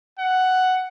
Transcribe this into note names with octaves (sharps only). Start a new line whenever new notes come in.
F#5